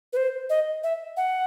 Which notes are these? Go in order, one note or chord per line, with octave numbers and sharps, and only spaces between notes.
B4
C5
D#5
E5
F#5